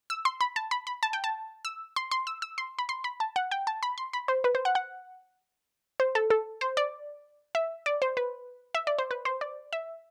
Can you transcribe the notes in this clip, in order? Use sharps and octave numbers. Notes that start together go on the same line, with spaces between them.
E6
C6
B5
A5
B5
B5
A5
G5
A5
E6
C6
C6
E6
E6
C6
B5
C6
B5
A5
F#5
G5
A5
B5
C6
B5
C5
B4
C5
F#5
F#5
C5
A4
A4
C5
D5
E5
D5
C5
B4
E5
D5
C5
B4
C5
D5
E5